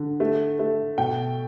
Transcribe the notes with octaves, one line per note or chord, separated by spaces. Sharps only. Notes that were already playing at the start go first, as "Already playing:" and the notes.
Already playing: D3
A3
A3
B2 G5